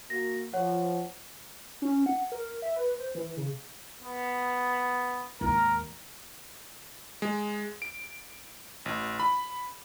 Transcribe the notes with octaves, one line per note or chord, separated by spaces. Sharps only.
A#3 F#4 A#6
F3 C#5 F#5
C#4
F#5
A#4
E5
B4
C5
E3
C#3
B3
D#2 G#2 A#4
G#3
D7
A1
B5